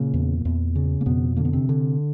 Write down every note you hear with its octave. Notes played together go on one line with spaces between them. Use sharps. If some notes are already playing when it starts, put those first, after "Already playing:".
Already playing: A#2 C#3 A#3
E2
E2
C#3
A#3
F2 B2 B3
D3 A#3
B3
C3 C4
D3